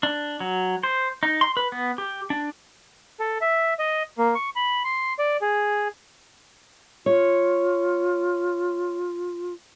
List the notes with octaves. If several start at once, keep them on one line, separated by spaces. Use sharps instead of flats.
D4
F#3
C5
D#4
C6
B4
B3
G4
D4
A4
E5
D#5
A#3
C#6
B5
C6
D5
G#4
F4 C#5